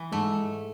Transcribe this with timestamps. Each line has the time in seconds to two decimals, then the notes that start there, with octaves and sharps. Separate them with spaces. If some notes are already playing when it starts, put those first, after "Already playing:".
Already playing: E3
0.11 G#2 G#3 A3